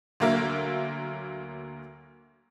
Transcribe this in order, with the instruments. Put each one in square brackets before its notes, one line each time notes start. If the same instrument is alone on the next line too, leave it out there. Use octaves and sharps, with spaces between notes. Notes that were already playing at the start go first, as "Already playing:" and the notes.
[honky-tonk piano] D2 F#3 A#3 A#4 E5